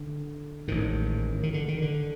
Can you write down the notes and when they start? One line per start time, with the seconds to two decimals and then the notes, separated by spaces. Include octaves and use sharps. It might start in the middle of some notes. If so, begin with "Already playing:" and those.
Already playing: D3
0.68 A1 G#2 D#3
1.43 D#3
1.54 D3
1.68 D#3
1.82 D3